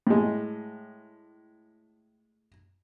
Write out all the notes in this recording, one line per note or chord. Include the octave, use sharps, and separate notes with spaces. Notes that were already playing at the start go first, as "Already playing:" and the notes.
A2 G#3